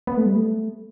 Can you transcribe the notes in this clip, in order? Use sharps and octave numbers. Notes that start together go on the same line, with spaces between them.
B3
A3
G3
A3